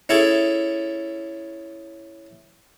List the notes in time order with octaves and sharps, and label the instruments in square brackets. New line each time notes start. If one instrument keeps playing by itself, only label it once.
[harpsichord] C#4 E4 G#4 A4